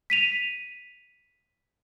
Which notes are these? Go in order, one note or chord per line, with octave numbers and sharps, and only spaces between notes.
B6 D#7 F7